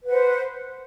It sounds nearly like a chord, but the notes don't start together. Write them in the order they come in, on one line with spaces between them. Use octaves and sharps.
B4 F#5 C5